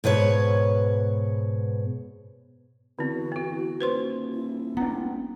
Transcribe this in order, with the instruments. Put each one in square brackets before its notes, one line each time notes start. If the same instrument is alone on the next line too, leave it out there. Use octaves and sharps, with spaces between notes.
[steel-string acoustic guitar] G#2 B2 B4 C#5
[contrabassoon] E2 [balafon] D3 C4 [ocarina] F#4
[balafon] B3 E4
[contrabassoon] D#1 [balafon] B4 C5 C6
[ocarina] E4
[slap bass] B3 D4 [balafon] A#5